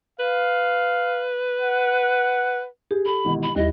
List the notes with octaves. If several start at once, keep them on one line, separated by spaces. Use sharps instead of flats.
B4 F5
F#5
G4 G#4
A4 B5
G#1 B2 E3
B5
D#2 G3 E4 D#5